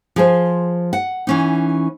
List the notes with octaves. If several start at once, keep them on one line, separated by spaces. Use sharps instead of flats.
F3 G#4 C5
F#5
E3 C#4 D#4